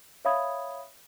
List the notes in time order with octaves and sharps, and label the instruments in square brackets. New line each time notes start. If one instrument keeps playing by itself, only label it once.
[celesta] C#5 E5 F5 B5 D#6 G#6